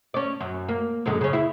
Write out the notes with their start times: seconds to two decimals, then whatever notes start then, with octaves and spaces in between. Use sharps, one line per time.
0.14 C#4 D5
0.41 F#2
0.69 A#3
1.06 F#2 D3 G#3
1.21 C#3 C#4
1.33 E4